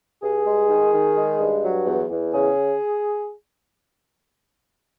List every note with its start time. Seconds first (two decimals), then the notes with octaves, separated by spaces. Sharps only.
0.22 G2 G#4
0.45 G#3
0.69 D#3
0.93 D#3
1.16 G#3
1.40 G2
1.63 F#3
1.86 E2
2.10 E2
2.33 C#3 G#4